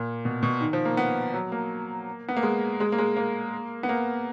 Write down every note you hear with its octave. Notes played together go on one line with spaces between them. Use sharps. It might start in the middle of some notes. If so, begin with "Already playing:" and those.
Already playing: A#2
B2
B2
D#3
F3
A#3
B3
F#3
A#3
B3
A#3
G#3
G#3
A#3
G#3
A#3
B3
A#3